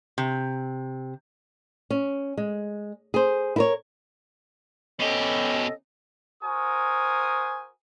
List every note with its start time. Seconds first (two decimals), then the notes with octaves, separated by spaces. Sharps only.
0.18 C3
1.91 C#4
2.37 G#3
3.14 G#4 C5
3.56 E4 A#4 C#5
5.00 B2 C#4 G4 A4 D#5
6.42 F#4 A#4 C5 G#5 D#6